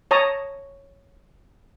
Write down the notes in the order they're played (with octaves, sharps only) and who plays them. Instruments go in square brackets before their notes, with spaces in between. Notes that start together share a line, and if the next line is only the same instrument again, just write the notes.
[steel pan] C#5 A5 A#5 D#6